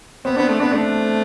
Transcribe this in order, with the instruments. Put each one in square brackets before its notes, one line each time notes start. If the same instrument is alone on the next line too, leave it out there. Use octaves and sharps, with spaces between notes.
[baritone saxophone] B3 [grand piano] C4
[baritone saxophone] B3 [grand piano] D4
[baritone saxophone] A3
[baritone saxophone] B3 [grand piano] D4
[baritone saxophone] A3 [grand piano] D4